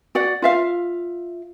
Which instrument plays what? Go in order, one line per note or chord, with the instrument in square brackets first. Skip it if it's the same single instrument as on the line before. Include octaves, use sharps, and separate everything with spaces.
[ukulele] F#4 D5 F#5
F4 E5 F5